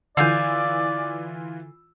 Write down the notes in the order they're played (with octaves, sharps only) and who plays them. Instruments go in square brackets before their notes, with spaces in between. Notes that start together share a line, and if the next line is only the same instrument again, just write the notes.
[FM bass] D3 [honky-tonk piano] E3 F4 E6 [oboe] D5 [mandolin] F5 G#5 G6